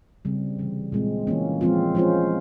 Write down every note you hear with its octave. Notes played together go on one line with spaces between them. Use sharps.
C#3 G3 C4
C3 E3 G3
A#2 G#3 C4
E3 A#3 C#4
F3 G#3 C4 F4
F3 G#3 C#4 F4 C5